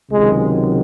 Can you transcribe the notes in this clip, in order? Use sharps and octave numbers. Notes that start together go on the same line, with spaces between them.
C#2 C3 D#3 F#3 G#3